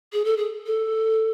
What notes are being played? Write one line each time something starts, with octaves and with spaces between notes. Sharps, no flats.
G#4
A4
G#4
A4